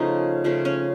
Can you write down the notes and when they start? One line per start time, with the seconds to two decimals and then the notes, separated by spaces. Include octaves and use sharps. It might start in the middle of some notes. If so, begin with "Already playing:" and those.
Already playing: C#3 F3 A3 C#4 D#4
0.44 C#3 F3 A3
0.65 C#4